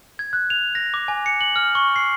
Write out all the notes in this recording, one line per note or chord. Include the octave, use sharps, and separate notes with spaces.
G#6
F#6
F7
A#6
D6
G#5
C#7
F#7
F6
C#6
C7